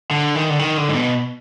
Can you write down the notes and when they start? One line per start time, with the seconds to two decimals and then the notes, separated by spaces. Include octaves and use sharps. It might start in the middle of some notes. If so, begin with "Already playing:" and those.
0.11 D3
0.35 D#3
0.50 D3
0.59 D#3
0.77 D3
0.89 G#2
0.95 B2